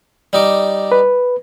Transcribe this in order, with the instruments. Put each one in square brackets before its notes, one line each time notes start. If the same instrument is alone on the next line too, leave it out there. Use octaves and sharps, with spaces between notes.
[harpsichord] G3 D#4 D6
[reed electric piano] B4